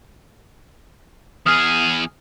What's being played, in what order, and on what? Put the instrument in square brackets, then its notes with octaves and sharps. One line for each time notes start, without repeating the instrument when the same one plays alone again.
[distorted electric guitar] E2 G#4 [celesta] D#6 F6